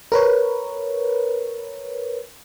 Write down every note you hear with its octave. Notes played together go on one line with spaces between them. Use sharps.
A#4 B4 C#5